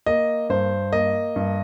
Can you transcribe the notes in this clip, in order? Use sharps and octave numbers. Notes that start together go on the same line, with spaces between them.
A#3 D#5
G2 C5
A#3 D#5
G2